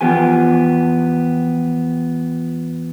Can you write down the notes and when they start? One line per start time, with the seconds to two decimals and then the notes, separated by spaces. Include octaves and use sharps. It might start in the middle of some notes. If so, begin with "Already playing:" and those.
0.01 E2 F3 B3 G4 G#5